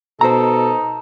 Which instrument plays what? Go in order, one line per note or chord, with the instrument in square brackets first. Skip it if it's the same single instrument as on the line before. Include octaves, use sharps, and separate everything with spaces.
[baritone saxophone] B2 [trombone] D#4 [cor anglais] A4 [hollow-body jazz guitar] C5 A#5